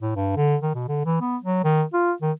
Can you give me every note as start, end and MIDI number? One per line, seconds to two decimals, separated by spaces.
0.01 0.13 45
0.16 0.36 43
0.36 0.56 50
0.62 0.73 51
0.74 0.83 47
0.88 1.01 50
1.05 1.18 52
1.21 1.36 59
1.42 1.61 54
1.64 1.83 51
1.93 2.12 65
2.22 2.32 51